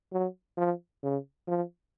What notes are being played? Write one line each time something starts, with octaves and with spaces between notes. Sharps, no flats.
F#3
F3
C#3
F3